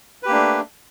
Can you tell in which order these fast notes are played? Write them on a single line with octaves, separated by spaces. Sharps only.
B4 G4 A#3 D4 A3